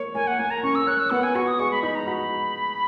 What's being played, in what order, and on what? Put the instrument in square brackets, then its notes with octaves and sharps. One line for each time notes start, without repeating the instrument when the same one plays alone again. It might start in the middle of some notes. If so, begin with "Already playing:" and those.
Already playing: [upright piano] A#3 C#5
[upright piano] A#3 [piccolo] G#5
[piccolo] F#5
[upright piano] A#3 [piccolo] G#5
[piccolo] A#5
[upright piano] C#4 [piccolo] C#6
[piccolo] E6
[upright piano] C#5 [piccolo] F#6
[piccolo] E6
[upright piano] B3 [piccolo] F#5
[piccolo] G#5
[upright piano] F#4 [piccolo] C#6
[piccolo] D#6
[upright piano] G#3 [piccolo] C#6
[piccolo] B5
[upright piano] D#4 [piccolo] B5
[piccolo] A#5
[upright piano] F#4 [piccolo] B5